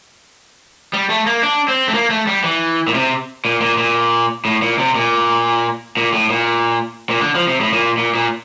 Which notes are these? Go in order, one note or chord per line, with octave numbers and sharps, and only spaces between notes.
G3
A3
A#3
D4
C4
A3
A#3
A3
G3
E3
A#2
C3
A#2
A#2
A#2
A2
A#2
C3
A#2
A#2
A2
A#2
A#2
D3
F3
C3
A2
A#2
A#2
A#2